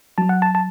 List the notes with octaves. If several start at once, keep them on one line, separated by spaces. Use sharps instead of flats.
F#3 A5
F#5
A5
A5